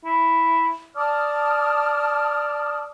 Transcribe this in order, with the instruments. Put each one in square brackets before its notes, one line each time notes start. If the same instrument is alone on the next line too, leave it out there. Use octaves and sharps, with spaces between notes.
[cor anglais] E4
[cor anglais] D5 [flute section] A5 D#6 F6